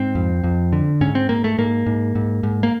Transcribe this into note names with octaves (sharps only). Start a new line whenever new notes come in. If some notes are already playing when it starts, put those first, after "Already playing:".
Already playing: G#2 C4
F2
F2
D3
G#2 C#4
C4
G#2 A#3
A3
G#2 A#3
G#2
G#2
G#2
A#3